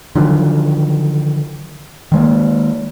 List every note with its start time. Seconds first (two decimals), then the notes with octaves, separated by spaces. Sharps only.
0.15 D3 D#3 F3 F#3
2.12 D#3 G#3 A#3